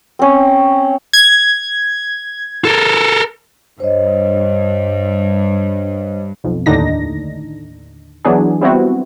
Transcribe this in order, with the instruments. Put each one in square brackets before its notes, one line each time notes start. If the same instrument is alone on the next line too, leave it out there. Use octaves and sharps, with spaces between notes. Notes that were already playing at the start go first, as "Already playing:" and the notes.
[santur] C4 C#4
[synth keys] G#6
[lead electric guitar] A4 A#4
[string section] G2 [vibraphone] C5 C#5 D#5
[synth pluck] B1 F2
D#2 A2 D3 D4 D#4 A#6
E3 F#3 B3 D4 G#4
G3 B3 C4 E4 F#4